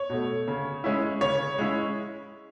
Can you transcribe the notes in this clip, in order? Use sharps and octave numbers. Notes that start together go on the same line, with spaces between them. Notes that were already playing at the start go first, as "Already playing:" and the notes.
Already playing: C#5
B2 A3
C#3
G#3 C#4 E4
C#3 C#5
G#3 C#4 E4